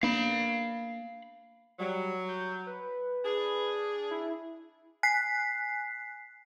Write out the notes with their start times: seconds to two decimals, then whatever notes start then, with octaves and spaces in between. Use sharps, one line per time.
0.03 A#3 B3 D4 F5 B5
1.79 F#3 G3
2.28 G6
2.66 B4
3.25 D4 G#4
4.11 E4
5.03 G#5 F#6 B6 C7